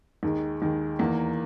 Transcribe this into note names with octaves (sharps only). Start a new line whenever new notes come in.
D#2 D#3 G#3
D#2 D#3 G#3
E2 D#3 A#3